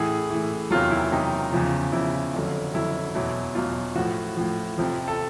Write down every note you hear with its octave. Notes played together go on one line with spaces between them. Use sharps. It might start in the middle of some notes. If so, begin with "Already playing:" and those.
Already playing: A2 E3 G#4
A2 E3
E2 C3 D#3 F#3 F4
E4
E2 C3 D#3 F#3 D#4
E2 C#3 F3
E2 C#3 F3 E4
F2 D3 F#3
F2 D3 F#3 E4
E2 B2 F#3 E4
E2 B2 F#3 F4
A2 F3 F#4
A2 F3
F2 C3 F3
A4